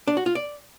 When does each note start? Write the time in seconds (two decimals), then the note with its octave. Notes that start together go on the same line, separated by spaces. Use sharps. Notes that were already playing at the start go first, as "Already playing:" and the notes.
0.07 D4
0.17 F#4
0.26 F4
0.35 D5